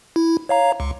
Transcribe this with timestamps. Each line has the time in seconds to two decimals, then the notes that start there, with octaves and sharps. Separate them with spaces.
0.16 E4
0.49 C#5 F5 A#5
0.80 C#2